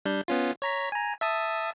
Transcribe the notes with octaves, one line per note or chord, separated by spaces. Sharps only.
G3 D4 G6
B3 C#4 F4
C#5 A#5 B6
G#5 A#5
E5 A5 D#6